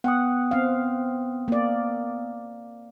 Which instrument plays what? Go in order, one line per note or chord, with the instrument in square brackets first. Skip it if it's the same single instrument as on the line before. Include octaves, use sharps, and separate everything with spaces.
[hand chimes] B3 G5 D#6 [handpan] F#5
[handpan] C4 F5
A#3 D5